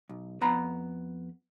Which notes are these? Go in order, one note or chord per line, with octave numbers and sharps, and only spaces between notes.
B1
F2 B3 A#5 B5